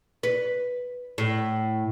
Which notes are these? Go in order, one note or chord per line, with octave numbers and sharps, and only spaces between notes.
B4
A2